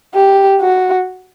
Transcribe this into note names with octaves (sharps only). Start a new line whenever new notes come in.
G4
F#4